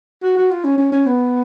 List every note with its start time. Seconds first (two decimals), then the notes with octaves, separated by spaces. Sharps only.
0.23 F#4
0.37 F#4
0.51 F4
0.64 C#4
0.78 C#4
0.92 C#4
1.06 B3